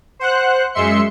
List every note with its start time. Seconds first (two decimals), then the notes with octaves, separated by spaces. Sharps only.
0.19 C5 F#5 F#6
0.74 F#2 G#3 E5 C6 C#7